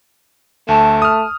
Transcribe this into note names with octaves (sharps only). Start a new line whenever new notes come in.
D2 A3 A5
D#6 F6